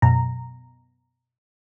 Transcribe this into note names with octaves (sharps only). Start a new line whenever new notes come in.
F#2 B2 A#5